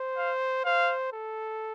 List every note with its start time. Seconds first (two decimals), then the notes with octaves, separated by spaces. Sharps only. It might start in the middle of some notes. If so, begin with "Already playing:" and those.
Already playing: C5
0.17 F5
0.65 C5 F5
1.13 A4